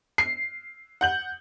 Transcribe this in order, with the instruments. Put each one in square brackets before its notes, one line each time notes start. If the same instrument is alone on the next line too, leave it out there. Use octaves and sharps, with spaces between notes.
[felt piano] C7
[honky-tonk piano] F#5 G6 F#7